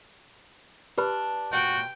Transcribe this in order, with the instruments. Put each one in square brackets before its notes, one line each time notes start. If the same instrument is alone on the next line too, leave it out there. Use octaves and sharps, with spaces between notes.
[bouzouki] D4 [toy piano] G4 B4 B5
[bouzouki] A#2 [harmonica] F#4 [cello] G5